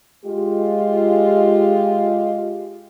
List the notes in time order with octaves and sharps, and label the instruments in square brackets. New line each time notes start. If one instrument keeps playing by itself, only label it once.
[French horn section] G#3 F4 G4